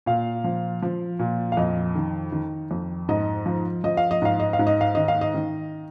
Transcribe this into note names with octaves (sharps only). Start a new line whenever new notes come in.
A#2 F5
F3
F3
A#2
F5
F2 D#5
D#3
D#3
F2
G#2 D#5
F3
F3 D#5
F5
D#5
G#2 F5
D#5
F5
G#2
D#5
F5
D#3 D#5
F5
D#5
D#3